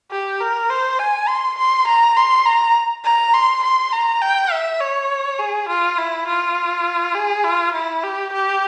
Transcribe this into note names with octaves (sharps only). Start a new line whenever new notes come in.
G4
A#4
C5
G#5
C6
C6
A#5
C6
A#5
A#5
C6
C6
A#5
G5
E5
C#5
G#4
F4
E4
F4
G#4
F4
E4
G4
G4